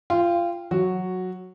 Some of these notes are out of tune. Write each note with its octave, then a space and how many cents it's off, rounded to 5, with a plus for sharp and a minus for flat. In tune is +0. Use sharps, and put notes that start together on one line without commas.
F4 -20 G5 +10
F#3 -10 F#4 +0